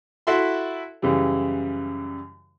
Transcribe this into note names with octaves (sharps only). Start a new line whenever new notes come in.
E4 F#4 A4 E5 C6
F#2 C#3 E3 G3